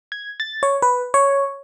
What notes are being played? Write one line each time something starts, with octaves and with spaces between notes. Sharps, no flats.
G#6
A6
C#5
B4
C#5